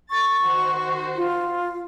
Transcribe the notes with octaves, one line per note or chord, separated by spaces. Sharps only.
C#6 A6
D#3 F#4 C5
F4